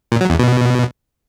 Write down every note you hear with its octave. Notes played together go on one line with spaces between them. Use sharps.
A#2
F#3
E2
B2